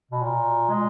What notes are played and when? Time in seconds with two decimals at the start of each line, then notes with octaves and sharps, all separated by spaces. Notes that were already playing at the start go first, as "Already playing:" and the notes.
0.11 B2
0.23 A#2
0.69 G#3